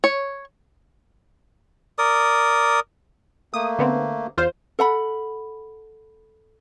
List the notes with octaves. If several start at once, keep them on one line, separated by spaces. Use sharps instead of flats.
C#5
A#4 D5 D#6
A3 A#3 D#6
D3 B3 C4
E2 F4 C5
A4 F#5 B5